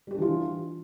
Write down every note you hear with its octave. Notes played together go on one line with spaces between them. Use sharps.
E3 G3 D4 F4 G4